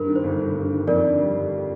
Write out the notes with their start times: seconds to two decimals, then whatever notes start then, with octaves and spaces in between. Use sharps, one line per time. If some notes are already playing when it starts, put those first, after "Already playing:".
Already playing: G2 A#4
0.08 D#3
0.16 C5
0.24 G1
0.39 G1
0.55 G2
0.71 D#3
0.87 F2 A#4 D5
1.04 D3
1.19 G3
1.36 G1